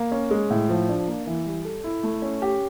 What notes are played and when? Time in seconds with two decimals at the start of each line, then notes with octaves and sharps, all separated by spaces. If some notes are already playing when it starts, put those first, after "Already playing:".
Already playing: A#3
0.12 C#4
0.31 G#3
0.50 A2
0.69 F3
0.89 D4
1.07 A#3
1.27 E3
1.46 G3
1.65 A4
1.84 E4
2.03 A3
2.22 C#4
2.42 G4